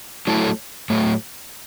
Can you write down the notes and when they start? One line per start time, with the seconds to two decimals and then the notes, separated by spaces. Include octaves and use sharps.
0.27 F#3 A3 E4 A4
0.90 A2 F#3 A3